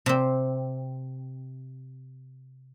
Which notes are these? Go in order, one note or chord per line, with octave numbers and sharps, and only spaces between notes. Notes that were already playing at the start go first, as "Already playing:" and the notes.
C3 C4